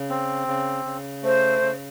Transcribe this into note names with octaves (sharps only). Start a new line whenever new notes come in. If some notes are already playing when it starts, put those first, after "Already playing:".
Already playing: C#3
C4
C#3
C#3
A3 C5
C#3